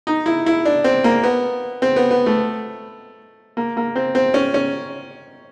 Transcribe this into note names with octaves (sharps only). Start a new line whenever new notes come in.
D#4
E4
E4
D4
C4
A#3
B3
C4
B3
B3
A3
A#3
A#3
C4
C4
C#4
C#4